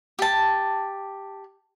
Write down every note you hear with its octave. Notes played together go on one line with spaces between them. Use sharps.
G4 A5